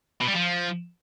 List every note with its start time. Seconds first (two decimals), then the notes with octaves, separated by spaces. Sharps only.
0.21 B2
0.28 G3
0.35 F3